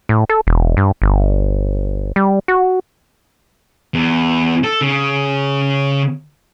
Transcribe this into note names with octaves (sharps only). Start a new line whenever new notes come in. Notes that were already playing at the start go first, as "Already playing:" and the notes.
A2
A4
E1
G2
G1
G3
F#4
E2
A4
C#3